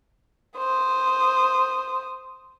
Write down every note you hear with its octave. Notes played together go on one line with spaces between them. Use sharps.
C5 D#6